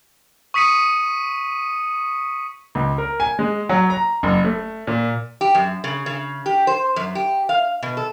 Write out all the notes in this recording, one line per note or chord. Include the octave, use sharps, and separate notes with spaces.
C#6 D#6 B6 C#7 D#7
C#2
A#4
G#5
G#3
F#3
A#5
F#1
A3
A#2
G4
F#2
C#3
C#3
G4
C5
F#2
G4
F5
B2
A4